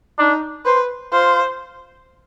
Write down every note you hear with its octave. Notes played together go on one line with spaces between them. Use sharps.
D4 D#4
B4 C5
F4 C5